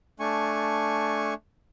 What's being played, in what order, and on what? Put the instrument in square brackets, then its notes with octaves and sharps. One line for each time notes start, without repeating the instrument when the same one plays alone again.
[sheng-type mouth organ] A3 D4 G#5 C#6